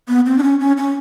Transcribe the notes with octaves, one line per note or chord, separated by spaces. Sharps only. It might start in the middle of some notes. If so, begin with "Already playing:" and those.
B3
C4
D4
C#4
C#4
C#4